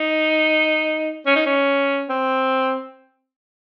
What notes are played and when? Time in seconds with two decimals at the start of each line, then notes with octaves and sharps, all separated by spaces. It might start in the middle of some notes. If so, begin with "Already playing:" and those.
Already playing: D#4
1.26 C#4
1.36 D#4
1.46 C#4
2.09 C4